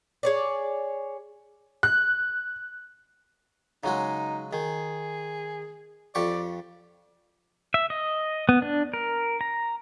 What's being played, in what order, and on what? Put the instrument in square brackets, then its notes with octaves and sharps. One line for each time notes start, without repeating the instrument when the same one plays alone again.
[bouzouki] G#4 C#5 D5
[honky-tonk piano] F#6
[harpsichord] C#3 F#3 G#3 [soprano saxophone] D#4
[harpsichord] D#3 [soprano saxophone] G#4
[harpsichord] F2 G4 C#6 [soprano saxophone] D5
[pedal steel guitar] E5
D#5
B3
D4
A#4
A#5